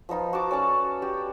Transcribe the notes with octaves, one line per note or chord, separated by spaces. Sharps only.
F3 B3 D#4 F4
F#4 A5 D6
C#4 A4 D5 A5
F#4 G4 G5